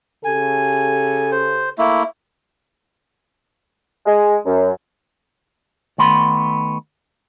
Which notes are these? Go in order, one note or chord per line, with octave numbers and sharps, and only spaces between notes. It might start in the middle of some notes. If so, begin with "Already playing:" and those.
C#3 G4 A4 G#5
C5
A3 A#3 E4
G#3
F#2
D#3 A3 B3 B5 C6